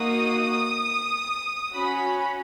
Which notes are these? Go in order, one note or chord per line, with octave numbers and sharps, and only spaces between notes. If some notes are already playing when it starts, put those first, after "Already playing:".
Already playing: A#3 D#4 F#4 D#6
C#4 F#4 B5